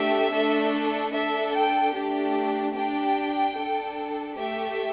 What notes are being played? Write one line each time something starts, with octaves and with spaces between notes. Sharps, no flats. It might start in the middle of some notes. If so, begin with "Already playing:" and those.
Already playing: A3 D4 G4 E5
A3 D4 A4
D4 A4 E5
G5
A3 D4 G4
D4 G4 G5
D4 A4
A3 G4 E5